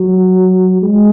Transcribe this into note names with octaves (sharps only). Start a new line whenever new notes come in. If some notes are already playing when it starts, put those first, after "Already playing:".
Already playing: F#3
G#3